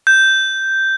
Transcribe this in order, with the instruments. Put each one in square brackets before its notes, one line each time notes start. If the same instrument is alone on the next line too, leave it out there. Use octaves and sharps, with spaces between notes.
[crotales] G6